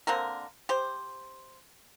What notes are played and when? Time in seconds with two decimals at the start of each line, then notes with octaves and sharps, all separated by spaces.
0.07 D3 A#3 C4 A#4
0.69 G4 C5